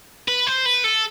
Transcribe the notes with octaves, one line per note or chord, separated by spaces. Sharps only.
B4
C5
B4
A4